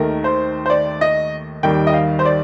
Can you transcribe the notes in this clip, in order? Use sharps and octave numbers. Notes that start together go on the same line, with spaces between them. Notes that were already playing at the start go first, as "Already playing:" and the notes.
Already playing: D#2 D#3 A3 A#4
C5
C5
D5
D#5
D#2 D#3 G3 G5
D#5
F5
C5
D5